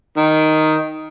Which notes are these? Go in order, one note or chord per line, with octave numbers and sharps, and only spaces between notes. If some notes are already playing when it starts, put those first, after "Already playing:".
D#3